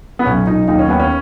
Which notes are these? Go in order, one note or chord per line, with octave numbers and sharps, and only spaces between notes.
B3
B1 C#4
B1 D#4
D#2 D#4
C#4
D#2 B3
C#4